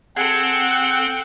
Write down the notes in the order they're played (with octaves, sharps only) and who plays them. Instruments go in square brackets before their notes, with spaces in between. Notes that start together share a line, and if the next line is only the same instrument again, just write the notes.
[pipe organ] C4 [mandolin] G#4 A4 [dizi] F#5